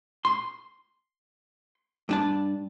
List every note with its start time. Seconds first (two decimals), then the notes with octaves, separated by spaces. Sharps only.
0.25 C6
2.09 G2 D4 A5